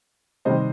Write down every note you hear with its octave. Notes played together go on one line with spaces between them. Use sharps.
C3 D#3 G3 C5 D#5